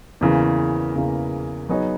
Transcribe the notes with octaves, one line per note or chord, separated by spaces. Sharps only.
E2 C#3 E3 A#3
E2 C#3 E3 A#3
F#3 B3 D#4 G#4 C#5